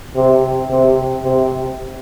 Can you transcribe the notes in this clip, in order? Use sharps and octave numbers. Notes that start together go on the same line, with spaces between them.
C3
C3
C3